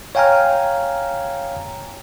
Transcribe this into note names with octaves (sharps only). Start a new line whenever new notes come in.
C#5 F5 G5 G#5 A#5 F6